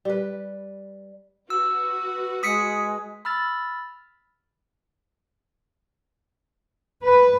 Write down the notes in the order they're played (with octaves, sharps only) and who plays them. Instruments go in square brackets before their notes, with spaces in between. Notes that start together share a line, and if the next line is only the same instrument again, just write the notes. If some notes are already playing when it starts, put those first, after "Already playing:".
[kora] G3 B4
[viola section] F#4 B4 [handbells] E6
[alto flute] G#3 [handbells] D#6 B6 C#7
[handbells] B5 E6 F6 A6
[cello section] B4